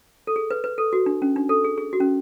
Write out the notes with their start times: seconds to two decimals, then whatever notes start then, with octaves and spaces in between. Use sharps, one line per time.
0.27 A4
0.36 G#4
0.50 B4
0.64 B4
0.78 A4
0.93 F#4
1.06 D4
1.22 C#4
1.36 D4
1.49 A4
1.64 G#4
1.78 G#4
1.93 F#4
2.00 C#4